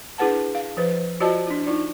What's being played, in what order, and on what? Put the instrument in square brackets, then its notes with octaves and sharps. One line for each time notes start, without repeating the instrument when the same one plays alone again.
[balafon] D4 E4 G#4 B4 F#5 A5
F5
F3 B4 C5
F4 F#4 C5 D5 D#5 A5
D4 E4
D#4 F4 D5